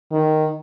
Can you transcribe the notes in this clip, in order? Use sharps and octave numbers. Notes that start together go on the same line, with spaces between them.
D#3